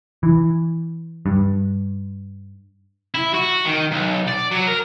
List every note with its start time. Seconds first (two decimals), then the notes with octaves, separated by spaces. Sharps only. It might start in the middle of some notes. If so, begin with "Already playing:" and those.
0.23 E3
1.26 G2
3.14 E4
3.34 F#4
3.65 D#3
3.91 B1
4.28 D5
4.51 F#3
4.67 A#4